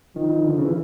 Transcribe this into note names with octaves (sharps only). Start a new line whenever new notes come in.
D#3 F3
D#3
D3
C#3
E3